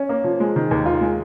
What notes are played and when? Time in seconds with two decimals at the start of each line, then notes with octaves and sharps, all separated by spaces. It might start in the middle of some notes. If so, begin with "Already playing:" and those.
Already playing: C#4
0.09 A#3
0.24 F3
0.40 G#3
0.56 D#3
0.71 D#2
0.86 F4
1.01 G#3